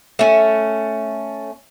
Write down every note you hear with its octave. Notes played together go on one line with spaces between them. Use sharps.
A3 C#4